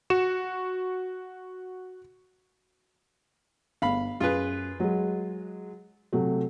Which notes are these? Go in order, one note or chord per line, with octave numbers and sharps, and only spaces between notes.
F#4 C#6 E7
G1 F5 B5
F#2 F4 G#4 B4
F#3 G#3
C3 F#3 A3